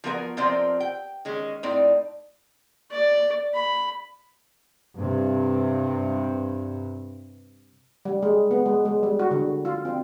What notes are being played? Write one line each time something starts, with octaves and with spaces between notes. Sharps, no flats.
F3 F#3 B3 A#4 C#5 G#5
C3 F3 C4 F4 A#4 D5
G5
D#3 G#3 C#4
A2 C4 D#4 D5
D5
B5
G2 C3
G3
G#3
B3
G#3
G#3
G3
F#4
D3
F4
C4